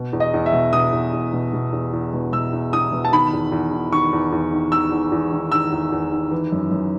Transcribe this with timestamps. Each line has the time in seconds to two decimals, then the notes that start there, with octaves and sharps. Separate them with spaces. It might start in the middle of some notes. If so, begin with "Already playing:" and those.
Already playing: B2
0.13 E2
0.20 D#5
0.34 E2
0.46 E5
0.53 B2
0.73 B2 D#6
0.93 E2
1.13 E2
1.33 B2
1.53 B2
1.73 E2
1.93 E2
2.13 B2
2.33 B2 E6
2.53 E2
2.73 E2 D#6
2.92 B2
3.05 A5
3.12 D#3 B5
3.33 E2
3.52 E2
3.72 D#3
3.92 D#3 C#6
4.13 E2
4.32 E2
4.53 D#3
4.72 D#3 E6
4.92 E2
5.12 E2
5.32 D#3
5.52 D#3 E6
5.72 E2
5.92 E2
6.12 D#3
6.31 E3
6.52 F#2
6.71 F#2